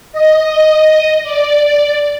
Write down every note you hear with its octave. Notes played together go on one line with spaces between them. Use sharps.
D#5
D5